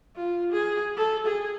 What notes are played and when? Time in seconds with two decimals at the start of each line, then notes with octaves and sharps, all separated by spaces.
0.16 F4
0.52 G#4
0.97 A4
1.26 G#4